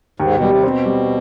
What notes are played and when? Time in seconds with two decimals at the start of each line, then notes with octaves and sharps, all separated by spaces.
0.20 D#2 G#2
0.35 B2
0.42 G3
0.48 C3
0.63 B2 C4
0.86 G3